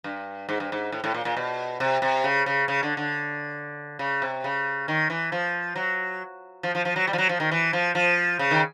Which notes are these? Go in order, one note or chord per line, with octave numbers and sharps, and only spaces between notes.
G2
G#2
G2
G#2
A2
A2
A#2
A#2
B2
C3
C3
C#3
C#3
C#3
D3
D3
C#3
C3
C#3
D#3
E3
F3
F#3
F3
F3
F3
F#3
G3
F3
F#3
F3
D#3
E3
F3
F3
C#3
D#3